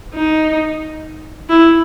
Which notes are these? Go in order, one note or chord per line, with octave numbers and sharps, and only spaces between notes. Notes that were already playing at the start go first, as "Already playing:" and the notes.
D#4
E4